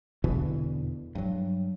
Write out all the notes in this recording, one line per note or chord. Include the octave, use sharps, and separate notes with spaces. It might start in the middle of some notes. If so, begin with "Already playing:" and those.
E2 B2 D3 E3
G2 F#3